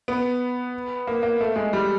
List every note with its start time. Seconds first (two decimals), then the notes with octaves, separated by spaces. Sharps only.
0.08 B3
1.07 A#3
1.23 A#3
1.41 A3
1.56 G#3
1.73 G3